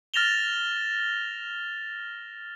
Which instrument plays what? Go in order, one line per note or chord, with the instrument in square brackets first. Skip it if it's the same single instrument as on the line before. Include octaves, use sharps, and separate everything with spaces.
[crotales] F6 A6 A#6 E7 F7 G7